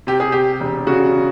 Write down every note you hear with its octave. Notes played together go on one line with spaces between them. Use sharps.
C3 G4
G#4
C3 G4
E1
C#3 F#4